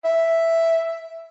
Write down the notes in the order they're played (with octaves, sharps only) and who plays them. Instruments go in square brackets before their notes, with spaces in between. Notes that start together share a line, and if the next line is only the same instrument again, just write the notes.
[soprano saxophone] E5